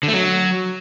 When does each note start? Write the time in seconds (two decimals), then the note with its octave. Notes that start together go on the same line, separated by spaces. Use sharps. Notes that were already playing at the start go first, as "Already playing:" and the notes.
0.03 D3
0.08 A3
0.13 F#3